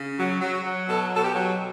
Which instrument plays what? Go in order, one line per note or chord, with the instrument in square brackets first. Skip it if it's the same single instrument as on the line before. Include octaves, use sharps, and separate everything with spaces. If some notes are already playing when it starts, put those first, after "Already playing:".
Already playing: [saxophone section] C#3
F#3
F#3
F#3
B2 A4
B2 A4
G4
F#3